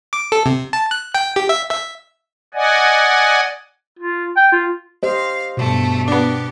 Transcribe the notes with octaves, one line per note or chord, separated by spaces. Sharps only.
D6
A4
C3
A5
F#6
G5
G4
E5
E5
D5 D#5 F#5 G#5
F4
G5
F4
G4 C5 D#5 F5
G2 B2 A3
B3 D4 G4